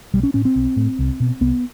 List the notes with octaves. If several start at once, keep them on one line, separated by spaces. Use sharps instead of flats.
B1 G3
C#4
A2 C#4
C4
B1
A2
C2
B2
C2 B3